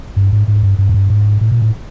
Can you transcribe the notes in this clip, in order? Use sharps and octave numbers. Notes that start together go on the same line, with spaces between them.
G2
G#2
G#2
G2
G2
F#2
G2
G#2
A2
A#2
A2